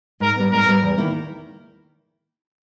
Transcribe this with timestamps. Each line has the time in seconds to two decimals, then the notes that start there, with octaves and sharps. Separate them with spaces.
0.20 G#2 A#4
0.36 G3 B3
0.51 G#2 A#4
0.66 G3 B3
0.83 E2
0.98 D#3 A#3 E4